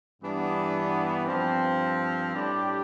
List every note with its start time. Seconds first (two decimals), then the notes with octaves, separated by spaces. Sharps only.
0.20 G2 E3 G3 B3 D4
1.27 G2 F3 C4
2.33 A2 G3 D4 G4